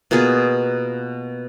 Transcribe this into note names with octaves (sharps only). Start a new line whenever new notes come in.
B2 A#3 F4 G#4